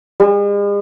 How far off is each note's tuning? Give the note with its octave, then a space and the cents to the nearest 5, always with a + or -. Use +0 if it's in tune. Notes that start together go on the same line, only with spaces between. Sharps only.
G#3 -45